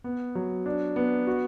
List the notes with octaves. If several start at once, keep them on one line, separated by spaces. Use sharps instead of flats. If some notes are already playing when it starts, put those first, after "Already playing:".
B3
F#3
D4
B3
F#4